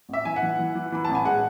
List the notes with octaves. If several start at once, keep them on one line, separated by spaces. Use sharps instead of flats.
A1 E5
E3 G#5
F#5
E3
E3
E3
E3 B5
A1 A5
G#5
G#3 F#5